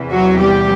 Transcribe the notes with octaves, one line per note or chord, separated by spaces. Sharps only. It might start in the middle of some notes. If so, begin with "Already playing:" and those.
Already playing: E2 C3 E3
F#3 F#4
G3 G4